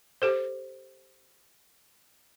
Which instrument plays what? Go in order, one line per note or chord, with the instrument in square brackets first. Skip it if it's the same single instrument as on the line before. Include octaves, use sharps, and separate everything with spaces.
[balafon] G4 A4 C5